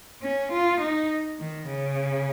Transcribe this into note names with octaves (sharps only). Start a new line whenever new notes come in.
C#4
F4
D#4
D#3
C#3